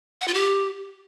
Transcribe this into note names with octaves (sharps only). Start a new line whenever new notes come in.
F#5
F4
G4